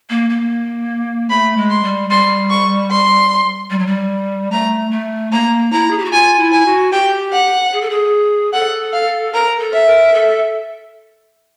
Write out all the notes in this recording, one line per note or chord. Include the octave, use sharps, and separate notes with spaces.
A#3
A#3
A3 B5
G#3
C6
G3
G3 C6
C#6
C6
G3
F#3
G3
A3 A#5
A3
A#3 A#5
E4 A#5
G#4
G4
F#4
F4 G#5
E4
G#5
F#4
G4 G5
F#5
G#4
A4
G#4
A4 F#5
F5
A#4 A#5
A4
E5
A#4
A4